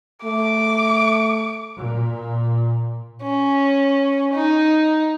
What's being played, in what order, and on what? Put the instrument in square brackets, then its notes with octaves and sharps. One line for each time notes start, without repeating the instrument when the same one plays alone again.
[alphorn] A3 [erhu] D6
[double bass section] A#2
[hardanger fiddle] C#4
D#4